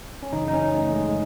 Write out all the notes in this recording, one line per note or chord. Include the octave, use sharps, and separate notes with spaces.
C#4
F#2 C#3 E3 D#4
D#4
C#4
A3
G#3